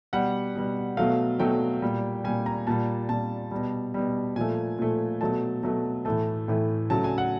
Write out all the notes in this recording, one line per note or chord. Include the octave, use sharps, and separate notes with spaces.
B2 G3 F#5
B2 G3
B2 F#3 A3 F5
B2 F#3 A3 G5
A#2 G3
A#2 G3 G#5
A#5
A#2 G3 A5
A#2 G3 A5
B2 G3
B2 G3
A#2 F3 A3 G#5
A#2 F3 A3
B2 F#3 A3 A5
B2 F#3 A3
A2 E3 A3 A5
A2 E3 A3
C#3 F#3 A3 A5
G#5
F#5